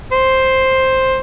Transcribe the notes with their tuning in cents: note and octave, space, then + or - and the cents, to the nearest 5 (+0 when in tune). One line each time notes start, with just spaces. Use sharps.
C5 +5